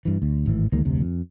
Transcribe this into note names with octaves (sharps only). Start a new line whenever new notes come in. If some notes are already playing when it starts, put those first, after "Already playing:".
G2 E3
D2
G#1 A2 E3
D2 D#3 G#3 A#3
F1 D2 C3
F2